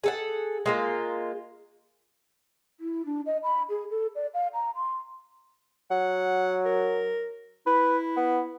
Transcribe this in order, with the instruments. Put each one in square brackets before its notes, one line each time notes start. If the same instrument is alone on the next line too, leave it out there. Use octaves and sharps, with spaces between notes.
[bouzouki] G#4 A4 F#5
G#3 A#3 F4
[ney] E4
D4
D#5
B5
G#4
A4
D5
F5
A#5
C6
[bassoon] F#3 [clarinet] F#5
[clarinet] A#4
[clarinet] E4 [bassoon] B4
[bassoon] B3